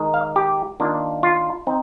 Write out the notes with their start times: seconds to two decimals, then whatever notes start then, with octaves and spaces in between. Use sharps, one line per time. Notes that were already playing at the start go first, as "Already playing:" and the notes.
Already playing: D#3 G#3 D#4
0.14 F5
0.36 G4
0.80 D#3 A#3 D4 F4
1.23 F4
1.67 C4 D#4